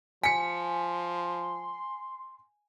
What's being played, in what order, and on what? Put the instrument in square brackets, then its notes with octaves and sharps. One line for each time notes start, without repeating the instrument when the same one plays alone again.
[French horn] F3 [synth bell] G#5 [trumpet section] C6 [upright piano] B6 C#7